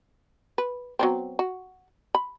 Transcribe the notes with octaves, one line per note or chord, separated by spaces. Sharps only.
B4
F#3 B3 C4
F#4
B5